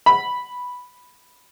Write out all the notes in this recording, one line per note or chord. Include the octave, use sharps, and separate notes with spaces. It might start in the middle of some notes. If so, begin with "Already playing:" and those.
B5